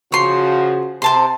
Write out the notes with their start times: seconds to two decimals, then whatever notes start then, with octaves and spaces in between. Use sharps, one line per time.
0.12 C#3 F3 F#4 C#5 C6
1.02 C3 C5 A5 C6